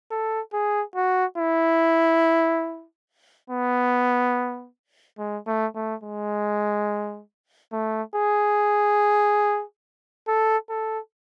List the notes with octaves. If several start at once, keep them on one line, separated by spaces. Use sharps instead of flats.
A4
G#4
F#4
E4
B3
G#3
A3
A3
G#3
A3
G#4
A4
A4